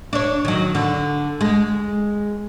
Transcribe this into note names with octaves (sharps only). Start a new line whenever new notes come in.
D4 C#5
D#3 F#3
D3
G#3